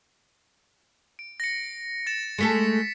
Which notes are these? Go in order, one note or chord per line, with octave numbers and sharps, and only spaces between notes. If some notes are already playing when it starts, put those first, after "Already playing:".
D7
A#6 C#7
A6 C#7 E7
G#3 A3 A4 B6 C#7